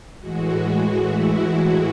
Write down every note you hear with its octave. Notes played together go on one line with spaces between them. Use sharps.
A2 E3 G#3 F#4
E4